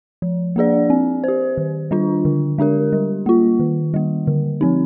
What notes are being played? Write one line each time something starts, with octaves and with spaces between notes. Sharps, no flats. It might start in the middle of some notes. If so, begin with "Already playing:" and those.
F3
A#3 D4 G#4 D5
C4
G4 C5
D#3
G3 D4 F4
D3
G#3 D4 G4 A#4
G3
A#3 F4
D#3
G3 A#3
D3
F3 C4 D#4